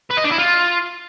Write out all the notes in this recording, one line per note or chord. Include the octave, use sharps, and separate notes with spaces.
B4
D#5
D4
E4
F4